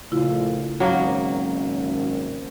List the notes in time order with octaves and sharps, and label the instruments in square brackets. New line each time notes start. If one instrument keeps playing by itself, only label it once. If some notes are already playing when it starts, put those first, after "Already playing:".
[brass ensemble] A#1 A3 F4 [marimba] C#3 E4
[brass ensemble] G#1 [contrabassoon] F#2 [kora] F#3 A#3